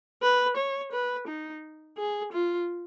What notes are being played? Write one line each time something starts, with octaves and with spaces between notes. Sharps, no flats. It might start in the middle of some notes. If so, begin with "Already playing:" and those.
B4
C#5
B4
D#4
G#4
F4